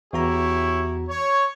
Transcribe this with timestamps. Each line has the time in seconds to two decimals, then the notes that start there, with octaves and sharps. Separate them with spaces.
0.13 E2 E4 F#4 G4 C#5 A#5
1.09 C#5